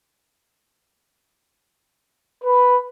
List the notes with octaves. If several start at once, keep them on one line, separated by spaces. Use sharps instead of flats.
B4